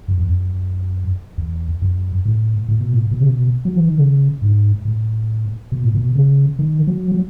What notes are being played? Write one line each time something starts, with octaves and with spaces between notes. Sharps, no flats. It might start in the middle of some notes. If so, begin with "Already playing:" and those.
F#2
E2
F#2
E2
F#2
A2
A2
B2
A2
B2
C#3
B2
F#3
E3
D#3
C#3
G#2
A2
B2
A2
B2
C#3
D#3
F#3
F#3